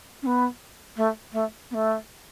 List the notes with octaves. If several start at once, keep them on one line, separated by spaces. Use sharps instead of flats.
C#4
B3
A3
A3
B3
A3